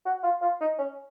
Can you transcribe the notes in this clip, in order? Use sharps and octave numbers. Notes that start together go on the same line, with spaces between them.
F#4
F4
F4
D#4
C#4